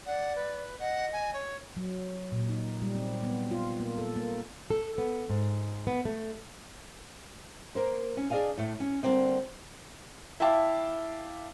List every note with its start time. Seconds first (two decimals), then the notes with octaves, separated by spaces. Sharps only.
0.06 D5 F#5
0.36 B4
0.80 D#5 F#5
1.13 G#5
1.34 C#5
1.77 F#3
2.32 A#2
2.49 D#4
2.82 G3
2.95 C4
3.23 B3
3.51 F4
3.80 A#3
3.98 A4
4.16 A#3
4.71 A4
4.98 B3
5.30 G#2
5.87 B3
6.05 A3
7.75 A#3 A#4 C5
8.17 C#4
8.30 D4 G#4 D5 D#5 F5 G#5
8.58 A2 A3
8.80 C#4
9.03 D3 G3 A#3 C4 D#4
10.40 E4 E5 F5 G5 A5 D6